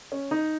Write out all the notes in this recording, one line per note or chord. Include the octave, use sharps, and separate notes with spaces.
C#4
D#4